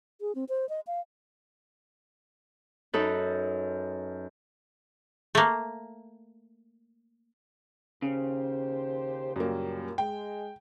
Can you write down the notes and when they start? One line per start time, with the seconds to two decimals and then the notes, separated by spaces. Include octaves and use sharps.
0.21 G#4
0.35 C4
0.49 C5
0.69 D#5
0.87 F5
2.94 F#2 D#4 A4 B4
5.35 A3 A#3
8.02 D#2 C#3 G4 C5
9.36 F#2 A#2 G3 A#3
9.98 G#3 G5